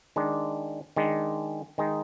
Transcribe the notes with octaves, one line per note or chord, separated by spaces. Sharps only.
D#3 G#3 D4
D#3 G#3 D4
D#3 G#3 D#4